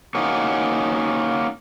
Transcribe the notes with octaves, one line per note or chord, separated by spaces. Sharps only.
A#3 C#4 D#4 F#4